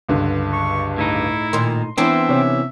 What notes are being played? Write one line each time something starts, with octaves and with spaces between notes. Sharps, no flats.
C#2 G2 D3
C#6
A2 D#4 E4
A#2 D#3 C6
E3 B3 C4 D4 E5
C3 C#4